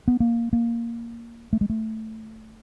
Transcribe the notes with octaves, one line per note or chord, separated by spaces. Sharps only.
B3
A#3
A#3
A3
G#3
A3